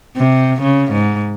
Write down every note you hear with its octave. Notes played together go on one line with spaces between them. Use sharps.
C3
C#3
G#2